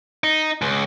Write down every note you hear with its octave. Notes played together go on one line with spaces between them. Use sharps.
D#4
C#2